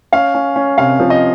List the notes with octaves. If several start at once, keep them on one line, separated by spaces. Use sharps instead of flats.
C#4 F5
C#4
C#4
C3 F5
F3
D#5